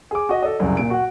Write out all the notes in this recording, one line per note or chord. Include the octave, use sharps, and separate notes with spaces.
G#4 D6
F#4 D#5
A4 D5 D#5
C2 F#2 C#3
A#2 D7
F#4 F#5